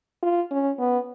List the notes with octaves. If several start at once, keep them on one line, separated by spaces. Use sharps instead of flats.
F4
C#4
B3